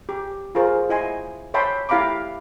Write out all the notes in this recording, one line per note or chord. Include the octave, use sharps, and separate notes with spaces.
G4
F4 G#4 A#4 C5
E4 D#5 G#5 C6
C#5 E5 G5 A5 B5 C6
E4 G4 F5 A#5 B5 D6